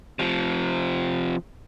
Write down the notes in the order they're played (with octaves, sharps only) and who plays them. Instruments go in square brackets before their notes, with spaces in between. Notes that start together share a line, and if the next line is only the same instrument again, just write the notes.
[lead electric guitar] C3 F3